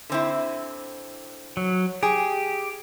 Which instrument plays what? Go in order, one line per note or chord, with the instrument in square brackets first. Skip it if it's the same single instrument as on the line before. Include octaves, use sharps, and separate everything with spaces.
[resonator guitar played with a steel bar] D3 C4 E4
[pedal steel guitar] F#3
[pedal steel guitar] G4 [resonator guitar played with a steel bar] G#4